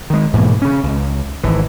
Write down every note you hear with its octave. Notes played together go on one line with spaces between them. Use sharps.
D#3 G#3
G#2 B2 E3 A#3
C#3 C#4
C#2
G#1 E3